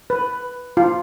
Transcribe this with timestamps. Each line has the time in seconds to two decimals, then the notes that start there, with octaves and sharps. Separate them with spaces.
0.10 B4
0.77 F4